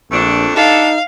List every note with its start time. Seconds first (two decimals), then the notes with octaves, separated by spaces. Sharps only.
0.11 A#1 F2 A3 D4
0.56 D4 D#4 G4 A4 F5